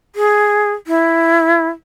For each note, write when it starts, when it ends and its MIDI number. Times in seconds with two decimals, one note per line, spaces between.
0.16 0.73 68
0.87 1.68 64